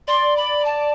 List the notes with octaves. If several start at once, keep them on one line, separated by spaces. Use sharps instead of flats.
D5 C6
B5
A5